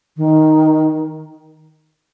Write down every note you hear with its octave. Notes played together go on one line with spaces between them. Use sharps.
D#3